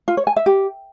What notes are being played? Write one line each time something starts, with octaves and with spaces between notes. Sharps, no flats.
F4
C#5
G#5
E5
G4